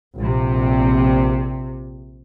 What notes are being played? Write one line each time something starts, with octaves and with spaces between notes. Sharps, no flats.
A#1 C3